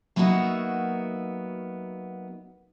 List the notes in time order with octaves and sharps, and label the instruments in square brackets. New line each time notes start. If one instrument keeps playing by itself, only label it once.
[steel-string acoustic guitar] F#3 A#3 B3 D#4 F#4 E5